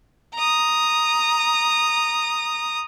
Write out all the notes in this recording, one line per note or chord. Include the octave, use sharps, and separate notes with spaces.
A#5 D#6